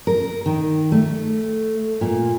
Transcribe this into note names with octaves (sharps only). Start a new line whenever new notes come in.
A#4
D#3
A3
A#2